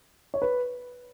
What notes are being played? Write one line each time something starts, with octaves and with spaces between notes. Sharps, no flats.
C#5
B4